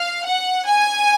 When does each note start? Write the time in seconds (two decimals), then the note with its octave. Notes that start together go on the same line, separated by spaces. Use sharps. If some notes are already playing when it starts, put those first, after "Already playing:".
Already playing: F5
0.26 F#5
0.68 G#5